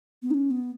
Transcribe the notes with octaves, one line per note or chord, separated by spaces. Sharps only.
B3
D#4
C#4
B3